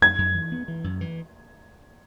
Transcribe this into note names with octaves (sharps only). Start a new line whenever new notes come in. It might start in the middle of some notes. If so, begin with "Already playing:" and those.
F#2 G#6
F#2
E3
B3
E3
F#2
E3